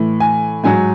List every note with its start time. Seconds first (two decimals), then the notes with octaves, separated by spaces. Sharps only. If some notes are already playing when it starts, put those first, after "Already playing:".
Already playing: A2 E3
0.20 G#5
0.64 G#2 F#3 G#5